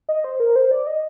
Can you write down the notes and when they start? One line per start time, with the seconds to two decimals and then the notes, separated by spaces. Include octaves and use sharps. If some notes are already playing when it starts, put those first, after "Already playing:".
0.09 D#5
0.24 C5
0.40 A#4
0.56 C5
0.71 D5
0.87 D#5